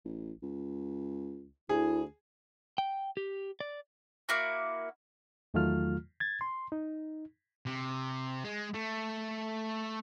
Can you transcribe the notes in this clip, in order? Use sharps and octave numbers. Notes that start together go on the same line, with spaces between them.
A1
C#2
D2 E4 G#4
G5
G4
D5
A#3 E4 F#4
E2 D#3 F#3 A3 F4 F6
G#6 A6
C6
D#4
C3
G#3
A3